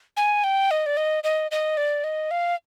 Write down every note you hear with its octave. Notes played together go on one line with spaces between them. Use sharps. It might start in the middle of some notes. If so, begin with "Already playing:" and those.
G#5
G5
D#5
D5
D#5
D#5
D#5
D5
D#5
F5